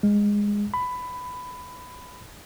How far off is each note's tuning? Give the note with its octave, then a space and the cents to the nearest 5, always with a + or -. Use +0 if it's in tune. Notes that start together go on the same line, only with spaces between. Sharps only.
G#3 -15
B5 +15